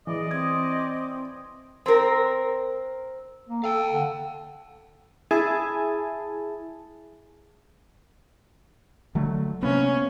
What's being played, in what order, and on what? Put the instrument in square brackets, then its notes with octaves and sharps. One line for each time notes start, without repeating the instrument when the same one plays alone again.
[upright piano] E3 [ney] G#4 [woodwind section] D5 D#5
[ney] C4 [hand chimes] D#6 G#6
[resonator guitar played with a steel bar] C4 A#4
[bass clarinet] A#3
[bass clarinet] A4 [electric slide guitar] F5 G5
[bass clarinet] D3
[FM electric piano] E4 G#4 G#5 A5
[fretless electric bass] D3 F#3 A3
[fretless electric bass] C3 A#3 B3 [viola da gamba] C#4